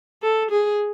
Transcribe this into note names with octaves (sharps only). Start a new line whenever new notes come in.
A4
G#4